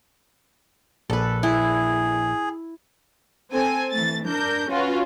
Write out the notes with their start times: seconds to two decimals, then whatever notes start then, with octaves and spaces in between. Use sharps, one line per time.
1.10 A#1 A4 B4
1.43 E4 G#4
3.52 C4 A4 G#5
3.92 E3 A3 A6
4.25 D4 A#4 G6
4.70 C#4 F4 F#4 B4